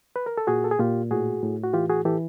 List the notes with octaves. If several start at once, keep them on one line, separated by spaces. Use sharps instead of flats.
B4
A#4
A4
A#2 F#4 G#4
A4
G#4
A#2 F4 G4
A2 F#4 G#4
A2
F#4
E3 F4 G4
F#4 G#4
E3 G4 A4